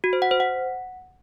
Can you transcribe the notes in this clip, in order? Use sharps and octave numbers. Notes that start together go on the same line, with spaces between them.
F#4
C5
F#5
C5
F#5